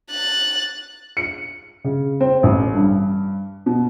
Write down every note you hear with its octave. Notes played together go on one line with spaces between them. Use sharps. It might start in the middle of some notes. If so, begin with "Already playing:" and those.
F#6 A6
C#7
C#3
C4
A1
G2
B2